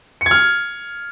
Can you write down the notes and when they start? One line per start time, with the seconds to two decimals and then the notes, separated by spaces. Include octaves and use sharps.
0.21 C#7
0.26 G#6
0.31 F6